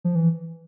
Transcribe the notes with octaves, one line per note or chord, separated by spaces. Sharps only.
F3
E3